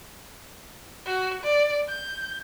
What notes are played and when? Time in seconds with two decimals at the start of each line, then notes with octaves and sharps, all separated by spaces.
1.06 F#4
1.43 D5
1.89 G6